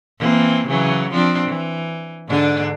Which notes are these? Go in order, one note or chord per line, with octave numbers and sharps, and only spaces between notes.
E3 A#3 C4
C#3 E3 F#3
F3 C4 D4
E3
G#2 D3 D4